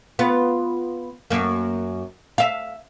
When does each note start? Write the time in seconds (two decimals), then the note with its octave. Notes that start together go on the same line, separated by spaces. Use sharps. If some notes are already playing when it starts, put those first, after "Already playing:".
0.19 B3 F4
1.30 F#2 A#3
2.38 E5 F5